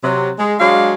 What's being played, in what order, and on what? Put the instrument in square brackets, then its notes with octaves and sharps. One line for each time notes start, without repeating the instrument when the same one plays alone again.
[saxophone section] C3 F#3
G#3
F#3 G#3 D4 F5